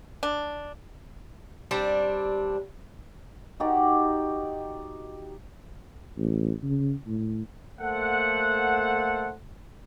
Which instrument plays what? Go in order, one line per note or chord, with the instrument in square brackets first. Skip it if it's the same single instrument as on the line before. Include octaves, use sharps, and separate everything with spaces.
[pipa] D4
[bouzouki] G3 C4 D4
[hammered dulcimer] D#4 F#4 G4 D5
[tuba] A1
C#3
A2
[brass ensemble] A3 A#3 A4 C5 F#5